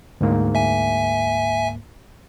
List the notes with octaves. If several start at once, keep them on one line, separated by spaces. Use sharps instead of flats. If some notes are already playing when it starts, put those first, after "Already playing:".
D2 G#2 A#3
E5 G#5